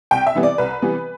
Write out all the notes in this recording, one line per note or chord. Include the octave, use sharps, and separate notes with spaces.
C2 G5
E5
C3 E3 G3 B3
D5
C2 B4
C3 E3 G3 B3